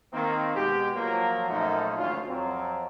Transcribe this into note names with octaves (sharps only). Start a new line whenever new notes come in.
D#3 A#3 C4
B2 G#3 F#4 G4
F3 F#3 A#3
F#2 A#2 F3 F#3 A3 D#4
G#1 D2 C#4 F4
F2 F#3 C4